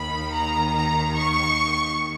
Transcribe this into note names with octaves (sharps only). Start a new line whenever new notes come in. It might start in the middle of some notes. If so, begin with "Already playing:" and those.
Already playing: D#2 D#3 B5
A#5
A#5
C#6